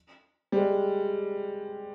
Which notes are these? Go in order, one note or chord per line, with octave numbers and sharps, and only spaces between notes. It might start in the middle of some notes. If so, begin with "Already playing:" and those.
G3
G#3